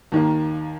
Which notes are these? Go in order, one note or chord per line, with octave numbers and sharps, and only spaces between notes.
D#2 D#3 A#3